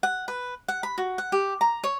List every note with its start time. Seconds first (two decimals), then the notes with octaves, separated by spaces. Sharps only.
0.03 F#5
0.28 B4
0.68 F#5
0.83 B5
0.98 F#4
1.18 F#5
1.32 G4
1.61 A#5
1.84 C#5